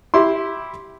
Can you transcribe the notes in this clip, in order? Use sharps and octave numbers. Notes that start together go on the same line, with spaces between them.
E4 G4 C6